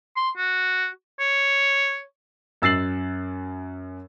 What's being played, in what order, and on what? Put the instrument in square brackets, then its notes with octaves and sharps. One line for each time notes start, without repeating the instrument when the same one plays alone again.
[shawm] C6
F#4
C#5
[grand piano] F#2 E6 A6 C7 F#7